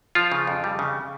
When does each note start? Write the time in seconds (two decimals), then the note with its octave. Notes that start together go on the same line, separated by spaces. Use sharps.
0.15 F3 F4
0.32 C#3
0.47 F2
0.64 G3
0.79 C#3